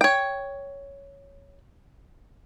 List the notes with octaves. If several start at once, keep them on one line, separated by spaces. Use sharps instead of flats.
C#5 G5